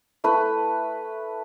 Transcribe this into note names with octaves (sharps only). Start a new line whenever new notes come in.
A3 E4 B4